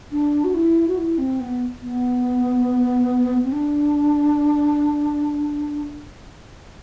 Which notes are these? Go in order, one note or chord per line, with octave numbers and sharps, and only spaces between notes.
D4
F#4
E4
F#4
E4
C4
B3
B3
C4
D4